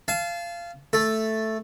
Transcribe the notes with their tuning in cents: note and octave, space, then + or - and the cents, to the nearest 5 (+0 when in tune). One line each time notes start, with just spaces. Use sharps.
F5 -20 A5 -30
A3 +0 A4 +0